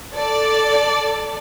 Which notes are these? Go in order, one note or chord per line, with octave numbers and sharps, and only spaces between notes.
A4 D5